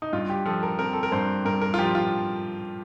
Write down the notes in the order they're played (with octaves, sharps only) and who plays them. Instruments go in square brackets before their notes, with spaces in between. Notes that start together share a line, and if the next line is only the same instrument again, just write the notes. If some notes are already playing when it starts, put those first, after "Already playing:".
[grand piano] D#4
G2 F4
G4
F3 A4
A#4
C4 A#4
A4
A#4
G2 C5
G2 A#4
A#4
F4
F3 G4
F4